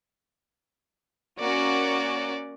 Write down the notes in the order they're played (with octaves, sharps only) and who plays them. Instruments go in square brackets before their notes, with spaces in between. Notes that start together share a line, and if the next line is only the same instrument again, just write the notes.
[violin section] A#3 C#4 F#4 [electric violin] D5